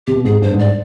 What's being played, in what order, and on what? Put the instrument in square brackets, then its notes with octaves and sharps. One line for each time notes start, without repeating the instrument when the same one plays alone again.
[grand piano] C3 [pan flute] G4
[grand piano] B2
[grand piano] G#2 [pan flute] G#4
[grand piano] G2 [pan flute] C5
[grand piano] G#2
[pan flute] D5